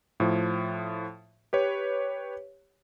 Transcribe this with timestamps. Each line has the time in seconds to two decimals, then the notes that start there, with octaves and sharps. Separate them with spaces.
0.20 A2 F3
1.53 G4 B4 C#5